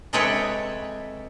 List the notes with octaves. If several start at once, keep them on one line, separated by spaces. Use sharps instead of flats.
C3 G#3 A4 B4 C#5 G5